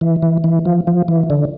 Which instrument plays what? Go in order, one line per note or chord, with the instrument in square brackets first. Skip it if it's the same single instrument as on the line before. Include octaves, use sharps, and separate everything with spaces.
[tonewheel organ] E3
E3
E3
F3
F3
E3
D3